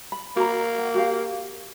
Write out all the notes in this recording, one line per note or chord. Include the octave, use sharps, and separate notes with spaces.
B5
A#3 F#4 A#5
F#5
F#4 G4 F5